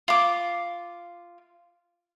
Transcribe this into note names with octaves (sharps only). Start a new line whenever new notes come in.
F4 D6